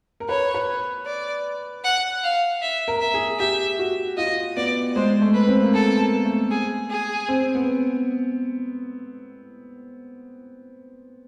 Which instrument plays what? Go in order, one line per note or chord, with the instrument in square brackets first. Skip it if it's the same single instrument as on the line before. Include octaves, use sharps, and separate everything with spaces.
[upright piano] A#4
[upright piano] B4 [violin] C#5
[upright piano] B4
[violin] D5
F#5
F5
E5
[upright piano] A#4
[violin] E5
[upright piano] G#4
[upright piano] G4 [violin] E5
[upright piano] F#4
[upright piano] F4 [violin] D#5
[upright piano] B3 [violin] D5
[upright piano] G#3 [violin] C5
[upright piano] A3
[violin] B4
[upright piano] C4
A#3
[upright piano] B3 [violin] A4
[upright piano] A#3
A3
[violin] G#4
G#4
[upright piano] C4
B3